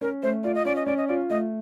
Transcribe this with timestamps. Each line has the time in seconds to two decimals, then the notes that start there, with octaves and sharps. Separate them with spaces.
0.01 C#4 A#4
0.23 A3 C5
0.44 F4 D5
0.55 D#5
0.65 C#4 D5
0.76 D#5
0.86 C#4 D5
0.97 D#5
1.08 F4 D5
1.30 A3 D#5